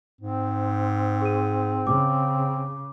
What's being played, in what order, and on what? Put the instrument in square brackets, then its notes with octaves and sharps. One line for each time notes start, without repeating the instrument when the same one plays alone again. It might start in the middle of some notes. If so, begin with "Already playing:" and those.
[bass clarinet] G#2 [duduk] C4
[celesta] G#4 D#7
[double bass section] C#3 [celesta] D6